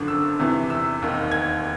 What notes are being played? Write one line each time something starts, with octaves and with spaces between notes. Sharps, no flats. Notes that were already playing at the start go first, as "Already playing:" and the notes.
Already playing: G#1 F#2 D3 F3 F#6
E6
E2 C3 E3
E6
E1 D#2 D#3
G#6